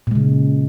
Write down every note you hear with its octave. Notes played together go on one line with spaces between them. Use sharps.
A#2 C#3 G#3